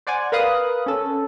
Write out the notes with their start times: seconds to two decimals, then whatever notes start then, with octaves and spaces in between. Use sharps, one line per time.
0.07 C5 D5 F#5 G#5
0.32 A#4 B4 F5 D#6 F#6
0.86 C#4 A4